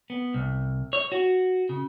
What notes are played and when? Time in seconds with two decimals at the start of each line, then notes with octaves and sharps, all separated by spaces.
0.10 B3
0.34 C2
0.93 C#5
1.12 F#4
1.69 C#3